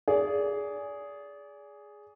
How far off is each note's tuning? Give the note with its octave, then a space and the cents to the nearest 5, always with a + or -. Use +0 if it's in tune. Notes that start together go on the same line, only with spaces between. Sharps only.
G#4 +0 D5 -30